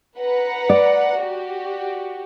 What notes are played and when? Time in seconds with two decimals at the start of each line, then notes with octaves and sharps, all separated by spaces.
0.19 B4 F#5 A#5
0.69 D5
1.18 F#4 G4